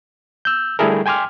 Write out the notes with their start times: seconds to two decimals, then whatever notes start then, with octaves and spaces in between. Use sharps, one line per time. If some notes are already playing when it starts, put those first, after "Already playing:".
0.45 E6 G6
0.79 D3 G3 A3 E4 G#4 A#4
1.06 G5 G#5 C6 D6 F6